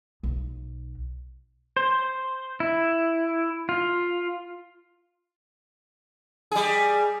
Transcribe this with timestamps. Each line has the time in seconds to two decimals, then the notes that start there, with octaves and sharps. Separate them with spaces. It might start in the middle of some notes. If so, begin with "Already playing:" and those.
0.23 B1
1.77 C5
2.60 E4
3.69 F4
6.52 G3 G#4